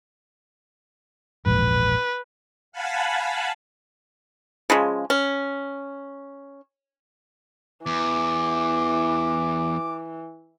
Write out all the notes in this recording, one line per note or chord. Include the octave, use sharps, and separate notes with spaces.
E1 A#1 G#2 B4
F5 F#5 G#5 A5 B5
C#3 F3 G#3
C#4
E2 E3 D6